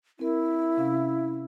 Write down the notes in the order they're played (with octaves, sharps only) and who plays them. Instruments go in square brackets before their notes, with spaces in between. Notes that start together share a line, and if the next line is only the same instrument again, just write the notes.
[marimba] C4 A#4 [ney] E4
[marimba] C3 C#4 F5